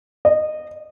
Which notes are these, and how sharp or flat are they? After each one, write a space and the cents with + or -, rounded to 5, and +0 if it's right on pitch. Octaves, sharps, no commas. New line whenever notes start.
D#5 -20